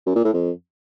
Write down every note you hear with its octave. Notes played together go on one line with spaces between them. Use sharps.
F#2
A#2
A2
F2